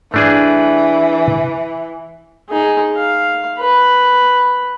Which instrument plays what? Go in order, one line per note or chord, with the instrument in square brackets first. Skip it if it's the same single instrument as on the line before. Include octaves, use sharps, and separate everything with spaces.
[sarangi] E3 [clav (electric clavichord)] A3 D4 G#4
[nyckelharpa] D#4 G#4
F5
B4